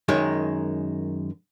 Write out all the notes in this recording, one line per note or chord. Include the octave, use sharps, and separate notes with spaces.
F#2 D#3 G#3